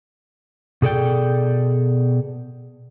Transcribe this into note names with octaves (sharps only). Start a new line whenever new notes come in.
B2 G#4 A4 D5 G5